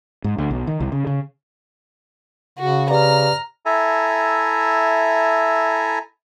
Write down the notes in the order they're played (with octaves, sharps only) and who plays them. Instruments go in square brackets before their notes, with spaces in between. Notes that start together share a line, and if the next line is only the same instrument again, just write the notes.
[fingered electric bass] G#2
D2
B1
D#3
C2
C#3
C#3
[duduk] C#3 [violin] F#4
[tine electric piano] G4 B4 D5 [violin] A#5 F6
[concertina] E4 A4 E5 G#5 A#5